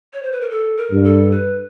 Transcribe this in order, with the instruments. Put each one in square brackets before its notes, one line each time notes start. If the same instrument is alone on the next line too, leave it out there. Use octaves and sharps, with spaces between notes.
[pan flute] C#5
C5
B4
A#4
A4
A#4
[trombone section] G2
[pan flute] A4
B4